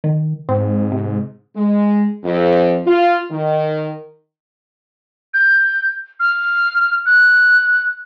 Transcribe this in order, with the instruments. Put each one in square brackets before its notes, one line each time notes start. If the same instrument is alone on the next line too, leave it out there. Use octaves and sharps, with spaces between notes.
[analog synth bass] D#3
[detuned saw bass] G#2 [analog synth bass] C4
[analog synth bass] C3
[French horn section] G#3
F2
F4
D#3
[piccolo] G6
F6
F#6